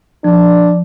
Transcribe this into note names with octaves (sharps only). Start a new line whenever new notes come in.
F3 D4